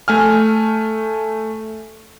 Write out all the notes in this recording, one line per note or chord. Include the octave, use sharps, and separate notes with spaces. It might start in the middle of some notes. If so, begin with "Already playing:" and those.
A3 G#5 F6